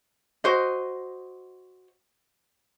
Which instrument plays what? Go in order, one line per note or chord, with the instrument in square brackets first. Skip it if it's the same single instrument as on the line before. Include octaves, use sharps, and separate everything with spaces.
[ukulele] F#4 C5 D#5